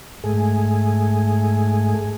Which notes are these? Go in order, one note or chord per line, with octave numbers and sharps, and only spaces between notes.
G#2 A3 G#4